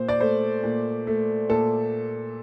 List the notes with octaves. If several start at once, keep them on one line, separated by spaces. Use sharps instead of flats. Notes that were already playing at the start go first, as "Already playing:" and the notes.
Already playing: A#2 C5
D5
A3 C5
A#2
A3
A#2 A4